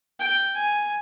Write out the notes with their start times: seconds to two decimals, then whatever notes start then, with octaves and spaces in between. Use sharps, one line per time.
0.19 G5
0.55 G#5